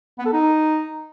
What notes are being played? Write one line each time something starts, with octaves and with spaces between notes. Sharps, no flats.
B3
A4
D#4